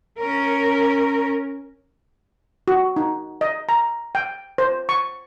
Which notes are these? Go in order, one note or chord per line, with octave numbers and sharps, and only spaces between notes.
C#4 A#4
F#4
D#4
D#5
A#5
G5
C5
C#6